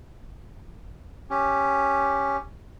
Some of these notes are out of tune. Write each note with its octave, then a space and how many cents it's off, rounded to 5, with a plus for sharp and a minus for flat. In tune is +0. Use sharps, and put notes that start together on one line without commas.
C#4 +0 G4 +5